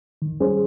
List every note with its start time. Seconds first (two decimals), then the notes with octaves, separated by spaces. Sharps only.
0.22 D#3
0.40 G3 C#4 G#4 C5